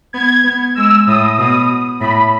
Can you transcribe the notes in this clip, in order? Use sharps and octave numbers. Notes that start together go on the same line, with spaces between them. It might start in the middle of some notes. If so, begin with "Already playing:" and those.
B3 G#6
B3
G#3 E6
A2 D#6
B2 D#6
A2 B5